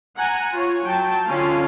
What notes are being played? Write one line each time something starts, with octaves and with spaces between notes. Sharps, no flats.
F#5 G#5 A#5
F4 C#5
F#3 G5 A5
D3 C#4 F4 F5 G#5